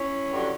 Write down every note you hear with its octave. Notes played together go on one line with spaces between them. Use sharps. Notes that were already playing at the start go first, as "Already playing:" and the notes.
Already playing: C#4 E4
G2 D3 F#3